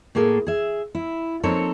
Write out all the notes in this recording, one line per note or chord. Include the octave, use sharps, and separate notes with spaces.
A2 A#3 G#4 A4
G#4 E5
E4
F3 A#3 C4 D#4 A4 C#5